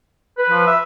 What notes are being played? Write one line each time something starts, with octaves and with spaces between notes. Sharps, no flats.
B4
F3
E5